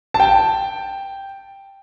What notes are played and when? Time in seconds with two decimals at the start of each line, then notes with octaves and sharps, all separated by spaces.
0.14 A5
0.20 G5